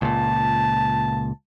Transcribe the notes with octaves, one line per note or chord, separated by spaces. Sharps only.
C#2 A#2 A5